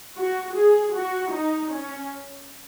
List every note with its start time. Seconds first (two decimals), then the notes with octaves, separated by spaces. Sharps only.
0.16 F#4
0.55 G#4
0.94 F#4
1.32 D#4
1.71 C#4